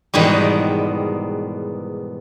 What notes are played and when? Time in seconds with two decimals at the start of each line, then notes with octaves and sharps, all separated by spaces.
0.14 E2 G#2 B2 D#3 G3